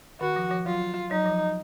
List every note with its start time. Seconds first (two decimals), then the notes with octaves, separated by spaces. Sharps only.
0.20 D#3 F#4
0.36 F3
0.51 F3
0.66 F#3 F4
1.11 F#3 D#4
1.26 F3